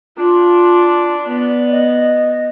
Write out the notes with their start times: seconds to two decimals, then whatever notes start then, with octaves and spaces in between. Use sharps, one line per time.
0.18 D4 F4
1.28 B3 D5
1.71 D#5